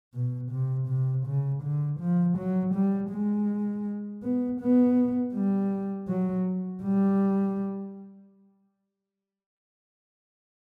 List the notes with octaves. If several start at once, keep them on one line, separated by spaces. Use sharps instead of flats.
B2
C3
C3
C#3
D3
F3
F#3
G3
G#3
B3
B3
G3
F#3
G3